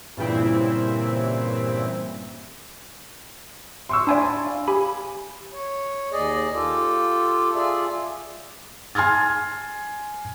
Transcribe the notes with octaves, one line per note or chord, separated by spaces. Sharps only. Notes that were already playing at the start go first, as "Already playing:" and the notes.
G2 A#2 C#3 E3 C4 E4
C6 C#6 E6
D4 D5 G#5 B5 C6
F5
G4 G#5 B5
C#5
D#2 G#4 D5 D#5
F4 G4 A4
F4 G#4 D5 E5
G#5 C6 F6 G#6 A6